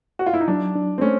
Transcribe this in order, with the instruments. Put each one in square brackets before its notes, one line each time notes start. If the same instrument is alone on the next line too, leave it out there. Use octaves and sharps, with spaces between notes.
[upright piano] F#4
F4
E4
D#4
[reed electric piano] F#3 [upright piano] D4
[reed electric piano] D4
[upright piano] C4
[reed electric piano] A3 [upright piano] C#4